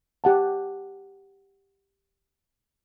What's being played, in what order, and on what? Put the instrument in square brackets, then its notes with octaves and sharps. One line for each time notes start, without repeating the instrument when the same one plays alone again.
[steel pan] G4 F#5 A5